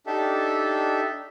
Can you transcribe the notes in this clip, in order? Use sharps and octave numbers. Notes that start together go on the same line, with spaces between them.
D4 D#4 G4 A4 E5